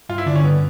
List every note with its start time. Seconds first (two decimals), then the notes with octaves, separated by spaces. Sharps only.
0.09 G2 F4
0.18 E4
0.26 D3 D4
0.35 C#4
0.44 G2 B3